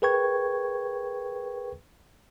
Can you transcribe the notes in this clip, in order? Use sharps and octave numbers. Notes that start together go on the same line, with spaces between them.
G#4 A#4 B4 G5 C#6 G#6